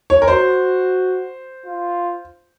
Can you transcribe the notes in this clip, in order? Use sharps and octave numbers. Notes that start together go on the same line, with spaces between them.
C#5
A#4
F#4 C5
F4